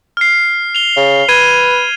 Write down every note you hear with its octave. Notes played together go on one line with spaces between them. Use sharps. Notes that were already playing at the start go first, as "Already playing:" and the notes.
F6 C7
F7 G7
C#3
B4 G#6 D#7